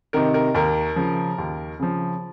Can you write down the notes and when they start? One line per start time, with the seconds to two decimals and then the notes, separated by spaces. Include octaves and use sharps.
0.13 C3 D#3 A#4
0.34 A#4
0.54 D#2 A#4
0.96 C#3 F3
1.38 D#2
1.79 C#3 F3